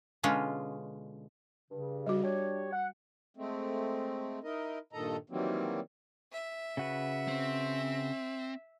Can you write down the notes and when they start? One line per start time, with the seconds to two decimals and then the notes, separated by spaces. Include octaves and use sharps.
0.23 B2 D3 G#3 C#4 F4
1.71 G2 C#3
2.06 G3 F#4
2.23 D4 G4 C#5
2.73 F#5
3.37 G#3 A3 C4
4.44 D#4 E4 A#4 D#5
4.93 G2 A#2 D#3 A4 D#5 A#5
5.30 D#3 E3 F#3 G3 A#3 C4
6.33 E5
6.77 C#3 F#4 B4
7.28 C4